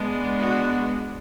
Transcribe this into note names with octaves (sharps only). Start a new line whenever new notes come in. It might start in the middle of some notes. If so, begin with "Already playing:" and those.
Already playing: G#3 B3 D4
F#4